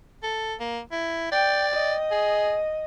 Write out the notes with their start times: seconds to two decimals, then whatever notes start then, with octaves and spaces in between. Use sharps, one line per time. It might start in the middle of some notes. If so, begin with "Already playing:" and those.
0.23 A4
0.60 A#3
0.92 E4
1.32 D5 G5
1.74 D#5
2.11 G#4